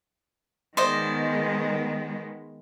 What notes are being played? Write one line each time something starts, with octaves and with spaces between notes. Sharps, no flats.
D#3 G#3 B3 C5 D5 D#5